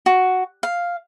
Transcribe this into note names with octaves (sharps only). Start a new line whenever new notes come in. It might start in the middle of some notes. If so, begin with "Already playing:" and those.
F#4
F5